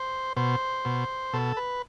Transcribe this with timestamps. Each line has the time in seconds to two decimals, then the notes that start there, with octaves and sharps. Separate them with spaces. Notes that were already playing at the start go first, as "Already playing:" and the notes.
Already playing: C5
0.36 B2 C5
0.85 B2
1.33 B2 A4
1.57 B4